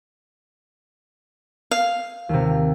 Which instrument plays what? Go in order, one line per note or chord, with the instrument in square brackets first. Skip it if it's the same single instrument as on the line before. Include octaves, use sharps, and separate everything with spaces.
[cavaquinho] F5
[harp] D#2 C3